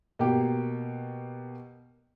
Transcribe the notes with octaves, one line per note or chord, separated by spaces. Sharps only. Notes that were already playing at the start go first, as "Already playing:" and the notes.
B2 A#3 G4